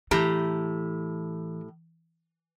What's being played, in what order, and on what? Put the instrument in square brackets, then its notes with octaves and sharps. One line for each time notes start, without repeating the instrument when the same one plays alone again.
[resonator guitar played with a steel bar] A2 G4 A#5 [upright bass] E3